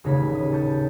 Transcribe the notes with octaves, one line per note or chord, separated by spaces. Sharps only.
D#1 A1 C#3 D#4 G#5 B6
D#6
A5 C#6 G6